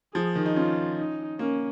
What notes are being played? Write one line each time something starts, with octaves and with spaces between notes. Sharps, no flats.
F3 G#4
D#3
D#4
C#4 F4
D#4
A#3 C#4